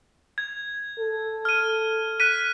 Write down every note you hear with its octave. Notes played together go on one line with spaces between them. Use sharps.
G#6
A4
F6 D#7
F#6 B6 D#7